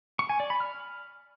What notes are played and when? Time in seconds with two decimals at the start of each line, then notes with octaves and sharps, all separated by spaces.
0.19 C#6
0.29 G#5
0.40 D5
0.50 B5
0.60 F6